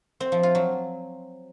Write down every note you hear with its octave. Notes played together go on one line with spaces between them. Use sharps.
C4
F3
F4
F#3